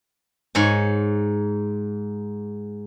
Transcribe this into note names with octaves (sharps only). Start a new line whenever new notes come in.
G#2 C#5 G#5